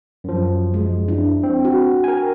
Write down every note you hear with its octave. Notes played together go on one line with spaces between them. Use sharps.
F#2 F3
G#3
D4 E4
C4
F#4
A#4 G5 G#5